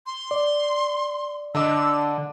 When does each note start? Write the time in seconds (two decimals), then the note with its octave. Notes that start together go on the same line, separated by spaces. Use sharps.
0.06 C6
0.31 D5
1.55 D3 D4 D#5 D6 E6